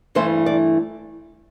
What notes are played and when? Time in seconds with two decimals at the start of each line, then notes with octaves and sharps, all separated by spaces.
0.15 G2 E3 A3 E4 C5
0.46 D5